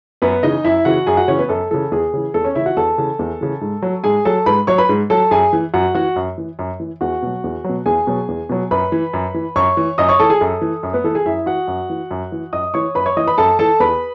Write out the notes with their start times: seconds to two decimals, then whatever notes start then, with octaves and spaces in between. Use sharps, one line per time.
0.22 F#2 B3 B4
0.43 C#3 E3 D#4 D#5
0.64 F#2 E4 E5
0.85 C#3 E3 F#4 F#5
1.06 F#2 G#4 G#5
1.17 F#4 F#5
1.28 C#3 E3 C#4 C#5
1.39 B3 B4
1.49 F#2 A4
1.71 C#3 E3 A4
1.92 E2 G#4
2.13 C#3 E3
2.34 E2 A4
2.44 C#4 C#5
2.55 C#3 E3 E4 E5
2.66 F#4 F#5
2.77 E2 A4 A5
2.98 C#3 E3
3.19 E2
3.41 C#3 E3
3.61 G#2
3.82 F#3
4.04 G#2 G#4 G#5
4.25 F#3 A4 A5
4.46 G#2 B4 B5
4.67 F#3 C#5 C#6
4.78 B4 B5
4.89 G#2
5.10 F#3 A4 A5
5.31 F#2 G#4 G#5
5.53 E3
5.74 F#2 F#4 F#5
5.95 E3 F#4 F#5
6.16 F#2
6.38 E3
6.59 F#2
6.80 E3
7.01 E2 F#4 F#5
7.22 B2 F#3
7.44 E2
7.64 B2 F#3
7.86 E2 G#4 G#5
8.07 B2 F#3
8.28 E2
8.49 B2 F#3
8.71 F#2 B4 B5
8.92 E3
9.13 F#2
9.34 E3
9.56 F#2 C#5 C#6
9.77 E3
9.98 F#2 D#5 D#6
10.09 C#5 C#6
10.19 E3 A4 A5
10.30 G#4 G#5
10.41 F#2 A4
10.61 E3
10.83 F#2
10.94 B3 B4
11.04 E3 A4
11.15 G#4 G#5
11.26 F#2 E4 E5
11.46 E3 F#4 F#5
11.68 F#2
11.90 E3
12.11 F#2
12.32 E3
12.53 F#2 D#5 D#6
12.74 E3 C#5 C#6
12.95 F#2 B4 B5
13.06 C#5 C#6
13.17 E3 D#5 D#6
13.27 B4 B5
13.38 F#2 A4 A5
13.59 E3 A4 A5
13.80 E2 B4 B5